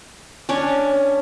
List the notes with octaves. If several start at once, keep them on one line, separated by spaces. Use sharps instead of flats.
C#4 D4 C#5